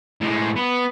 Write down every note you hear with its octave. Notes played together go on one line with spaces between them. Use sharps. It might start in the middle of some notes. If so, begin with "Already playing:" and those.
A2 G#3
B3